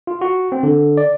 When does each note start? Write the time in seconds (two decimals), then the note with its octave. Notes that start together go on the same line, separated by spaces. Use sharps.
0.07 F4
0.21 F#4
0.52 C4
0.63 D3
0.97 D5